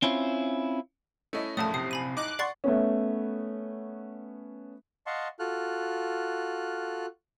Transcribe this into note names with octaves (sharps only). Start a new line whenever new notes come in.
C4 C#4 E4 F4
A3 C#4 E4 D#5
A#1 F#2 A2 A3 A5 D#6
C3 D#6 C7
G#5 B5 D#7
D#4 D6 F#6
D5 F#5 C6 C#6 A6 C7
A3 B3 C#4
D#5 F5 F#5 A5 C6 C#6
F4 F#4 A4 F6 F#6